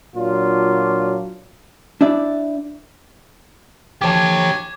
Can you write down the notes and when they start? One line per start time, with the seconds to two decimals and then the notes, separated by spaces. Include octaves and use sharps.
0.16 A#2 F#3 D4 F4
2.01 D4 E4 D5
4.02 D3 F3 G4 C#5 G#5 A5 D6 G#6